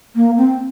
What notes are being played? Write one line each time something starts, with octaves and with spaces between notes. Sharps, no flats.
A#3
C4